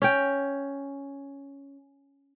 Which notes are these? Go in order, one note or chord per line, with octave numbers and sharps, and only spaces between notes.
C#4 G5